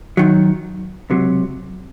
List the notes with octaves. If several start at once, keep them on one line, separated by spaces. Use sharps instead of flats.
F#2 D#3 F#3
C#2 C3 F#3